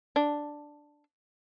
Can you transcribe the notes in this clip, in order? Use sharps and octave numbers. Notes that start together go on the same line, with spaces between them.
D4